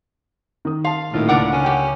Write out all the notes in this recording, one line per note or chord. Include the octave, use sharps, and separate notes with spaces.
D#3 D#6
F5 A5 C6
D#1 A2 D#4 F4
C#2 D4 A#4 F#5 D6
C#4
G4 F#5